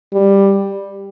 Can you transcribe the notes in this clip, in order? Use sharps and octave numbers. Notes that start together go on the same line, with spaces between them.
G3